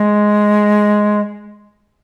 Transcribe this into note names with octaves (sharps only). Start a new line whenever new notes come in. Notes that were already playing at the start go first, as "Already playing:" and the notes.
Already playing: G#3